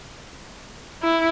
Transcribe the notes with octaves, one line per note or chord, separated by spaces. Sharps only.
E4